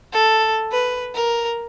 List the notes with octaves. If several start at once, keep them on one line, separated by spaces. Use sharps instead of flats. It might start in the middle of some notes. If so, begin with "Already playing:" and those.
A4
B4
A#4